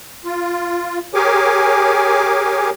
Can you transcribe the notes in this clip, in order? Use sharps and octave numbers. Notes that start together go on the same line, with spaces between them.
F4
G4 G#4 A#4 C#5 G#5 D6